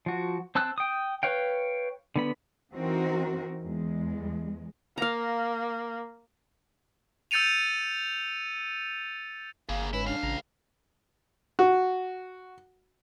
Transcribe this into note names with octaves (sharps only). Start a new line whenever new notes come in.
F3 F#4
C4 A5 E6 F#6
G5 D#6
B4 C#5 F5 G5
D3 B3 B5
E3 C4 D#4 F#4 A#4
E2 G#3
A#3 F5 A#5
E6 G6 A6 C#7 D#7 F7
G1 A#3 G#4 F5
G#2 C#4 E4 B4
C#2 D4 F5
A1 C#3 A#5
F#4